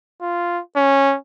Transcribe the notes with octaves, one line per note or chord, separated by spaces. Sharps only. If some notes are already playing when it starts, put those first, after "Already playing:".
F4
C#4